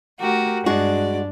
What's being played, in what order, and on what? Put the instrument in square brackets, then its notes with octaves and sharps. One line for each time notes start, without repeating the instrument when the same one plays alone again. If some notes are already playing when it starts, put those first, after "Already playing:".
[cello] A3 [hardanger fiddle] F#4 [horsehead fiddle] G4 A#4
[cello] G2 [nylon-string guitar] G#3 F#4 [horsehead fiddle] D4 [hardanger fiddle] D5